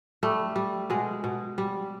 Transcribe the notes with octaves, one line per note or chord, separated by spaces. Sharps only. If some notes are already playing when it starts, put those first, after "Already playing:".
G3 A3
G3
B2 G#3
B2
G3